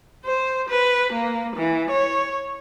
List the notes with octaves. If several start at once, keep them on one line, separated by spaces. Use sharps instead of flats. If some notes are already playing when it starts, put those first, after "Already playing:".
C5
B4
A#3
E3
C#5